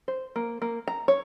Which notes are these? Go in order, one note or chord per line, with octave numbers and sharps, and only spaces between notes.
C5
A#3
A#3
A#5
C#5